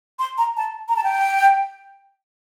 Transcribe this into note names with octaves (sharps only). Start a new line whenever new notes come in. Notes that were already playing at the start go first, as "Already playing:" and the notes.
C6
A#5
A5
A#5
A5
G5